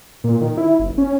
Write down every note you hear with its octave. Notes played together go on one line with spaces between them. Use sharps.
A#2
D#3
E4
F#1
C#4